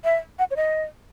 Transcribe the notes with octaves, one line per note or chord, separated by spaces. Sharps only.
E5
F#5
C#5
D#5